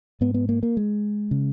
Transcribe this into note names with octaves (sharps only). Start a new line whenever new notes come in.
G#2 B3
B3
A#3
A#3
G#3
C#3